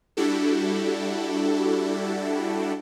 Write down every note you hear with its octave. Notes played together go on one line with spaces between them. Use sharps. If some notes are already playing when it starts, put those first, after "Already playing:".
G3 D4 E4 F#4 G4 A4